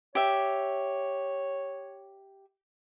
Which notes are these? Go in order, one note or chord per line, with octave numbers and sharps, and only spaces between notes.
G4 C#5 E5